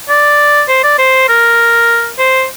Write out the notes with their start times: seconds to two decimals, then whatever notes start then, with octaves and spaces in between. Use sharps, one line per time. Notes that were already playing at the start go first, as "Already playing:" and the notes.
0.09 D5
0.68 C5
0.83 D5
0.99 C5
1.29 A#4
2.19 C5